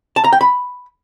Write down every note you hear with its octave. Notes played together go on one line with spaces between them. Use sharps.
A5
A#5
G5
B5